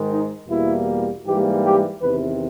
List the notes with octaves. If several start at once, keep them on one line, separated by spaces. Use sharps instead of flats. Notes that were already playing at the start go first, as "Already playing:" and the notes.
Already playing: G#2 D#3 G#3
D#4
E2 B2 G3 A#3 E4
G#2 E3 G3 A#3 G4
G4
E2 C3 D#3 B4